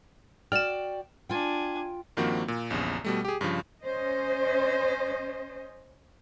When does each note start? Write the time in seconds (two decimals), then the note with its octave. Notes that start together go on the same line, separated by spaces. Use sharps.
0.52 F#4 D5 G5 F6 E7
1.30 D4 F4 G5 G#5
2.17 G2 D#3 F3 A#3 C4 F#4
2.48 A#2
2.70 A#1 E2 G2 C#3
3.04 B2 G3 A3
3.25 G4 G#4
3.41 G2 C#3 F3
3.84 C#4 C5 D#5